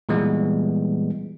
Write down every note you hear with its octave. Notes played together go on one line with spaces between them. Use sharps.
A#2 E3 G3 G#3 B3